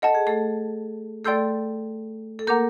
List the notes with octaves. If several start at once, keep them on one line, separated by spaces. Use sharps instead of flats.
A4 D#5 F#5 A5
G#4
A3 A4
A3 A4 D5 G5 C6 E6 G6
A4
A#3 A#4 F#5 A#5 D6 G6